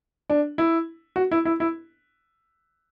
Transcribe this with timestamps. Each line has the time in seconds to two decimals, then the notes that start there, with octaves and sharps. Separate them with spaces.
0.30 D4
0.58 E4
1.16 F#4
1.31 E4
1.45 E4
1.60 E4